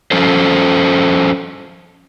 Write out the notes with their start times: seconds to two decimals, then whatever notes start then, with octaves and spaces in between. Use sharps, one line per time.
0.11 F3 C#4 A4 C5